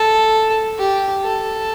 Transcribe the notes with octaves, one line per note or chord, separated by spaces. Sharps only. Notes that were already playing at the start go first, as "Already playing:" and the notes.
Already playing: A4
G4
A4